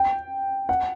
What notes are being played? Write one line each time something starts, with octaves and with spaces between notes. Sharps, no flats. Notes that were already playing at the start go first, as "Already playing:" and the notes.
Already playing: G5
F#5